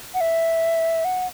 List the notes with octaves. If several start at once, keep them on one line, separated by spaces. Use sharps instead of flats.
F#5
E5
F#5